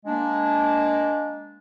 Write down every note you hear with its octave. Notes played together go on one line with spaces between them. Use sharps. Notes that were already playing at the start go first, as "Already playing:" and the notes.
G#3 A#3 D4